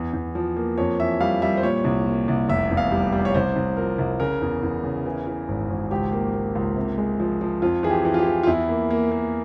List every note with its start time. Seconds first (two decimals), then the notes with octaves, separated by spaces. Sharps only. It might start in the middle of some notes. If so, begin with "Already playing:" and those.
Already playing: E2
0.13 E2
0.35 F3
0.57 A#3
0.78 F2 C#5
1.00 E3 E5
1.20 G3 F5
1.42 G3 E5
1.57 C5
1.63 A#2 C#5
1.84 C2
2.06 A#2
2.28 C2
2.49 F1 E5
2.71 E2
2.77 F5
2.92 G3
3.12 G3
3.25 C#5
3.34 C2 C5
3.56 C2
3.77 F3 A#4
3.98 C2
4.20 C#3 A#4
4.42 E2
4.63 E2
4.84 C#3
5.06 E3
5.27 E3
5.48 G#1
5.70 G#1
5.91 C#2 G4
6.12 A#3
6.33 A#3
6.55 C#2
6.76 C3
6.98 G#3
7.20 F3
7.41 F3
7.62 F2 F4
7.83 E3 G#4
7.90 G4
8.05 E3
8.14 F4
8.19 G4
8.27 E3
8.43 F4
8.47 E2 E4
8.69 A#3
8.90 A#3
9.11 A#3